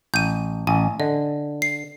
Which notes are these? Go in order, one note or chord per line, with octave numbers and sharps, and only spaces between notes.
A1 G6 D#7
A1 G#5
D3 D#5
C7